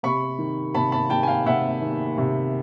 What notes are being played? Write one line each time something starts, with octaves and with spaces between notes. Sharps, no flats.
C3 B5 C#6
D#3
C3 A5 B5
A5 B5
D#3 G5 A5
G#5
F5 G5
C3 E5 F#5
D#3
C3